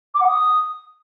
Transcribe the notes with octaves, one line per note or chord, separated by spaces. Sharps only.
D6
F#5
D#6